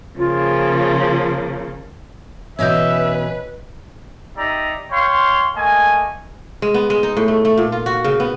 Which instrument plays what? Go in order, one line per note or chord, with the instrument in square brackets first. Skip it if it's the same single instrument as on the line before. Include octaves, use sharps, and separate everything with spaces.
[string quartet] C#3 F3 A#3 [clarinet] F4
[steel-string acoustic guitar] B2 E3 C#4 [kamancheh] B4 [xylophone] C#5 D#5 G6 [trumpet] E5
[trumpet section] D#4 G4 D5 E5 A#5
C#5 F5 G5 C6
A3 A#3 D#5 G#5
[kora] G#3
B3
G#3
D#4
A2
A3
A3
A#2
F4
F#4
C#3
B3